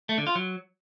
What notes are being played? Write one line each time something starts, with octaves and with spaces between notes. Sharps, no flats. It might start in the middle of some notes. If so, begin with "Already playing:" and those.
A3
D3
F4
F#3